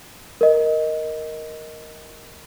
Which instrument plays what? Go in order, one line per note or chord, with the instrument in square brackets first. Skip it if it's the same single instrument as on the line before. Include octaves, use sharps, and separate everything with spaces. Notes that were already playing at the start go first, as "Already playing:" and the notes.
[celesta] A#4 D#5